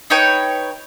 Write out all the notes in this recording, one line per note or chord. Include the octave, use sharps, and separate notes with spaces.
D#4 B4 C#5 G5